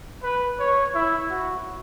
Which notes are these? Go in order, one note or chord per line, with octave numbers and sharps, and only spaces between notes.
B4
C#5
E4
F#4